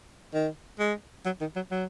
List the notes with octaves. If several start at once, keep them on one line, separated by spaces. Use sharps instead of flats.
D#3
G#3
F#3
D#3
F#3
F#3